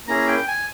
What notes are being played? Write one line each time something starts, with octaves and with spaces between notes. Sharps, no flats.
A#3 C#4 E4 G#4 A#5
G5
G#5